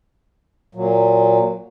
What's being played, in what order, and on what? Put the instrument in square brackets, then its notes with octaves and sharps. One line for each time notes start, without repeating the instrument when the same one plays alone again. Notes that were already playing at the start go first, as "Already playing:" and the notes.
[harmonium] A#2 F#3